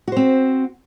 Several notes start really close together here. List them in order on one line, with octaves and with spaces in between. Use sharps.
F#4 C5 C4